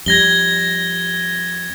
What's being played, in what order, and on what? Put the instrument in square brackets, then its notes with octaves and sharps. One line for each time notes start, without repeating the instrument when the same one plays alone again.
[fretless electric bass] F2 G3 [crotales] G#6 A#6 G7